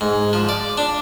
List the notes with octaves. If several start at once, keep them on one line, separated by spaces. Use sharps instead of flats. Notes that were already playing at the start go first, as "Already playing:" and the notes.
G#2
F3
D5
D4